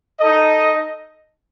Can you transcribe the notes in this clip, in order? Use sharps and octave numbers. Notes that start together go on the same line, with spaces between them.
D#4 A4 D#5